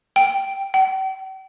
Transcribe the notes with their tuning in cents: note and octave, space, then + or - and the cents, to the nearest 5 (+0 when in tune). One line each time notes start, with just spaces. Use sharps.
G5 -5
G5 -45